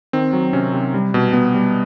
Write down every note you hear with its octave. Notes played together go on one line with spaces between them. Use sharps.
D#3 C4
F#3
C3 C#4
C3
G3
B2
B2 B3
G3